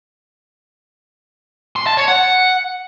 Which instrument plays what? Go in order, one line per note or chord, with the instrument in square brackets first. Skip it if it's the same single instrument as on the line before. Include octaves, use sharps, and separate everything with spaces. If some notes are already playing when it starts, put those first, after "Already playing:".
[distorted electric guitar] C6
A5
C#5
F#5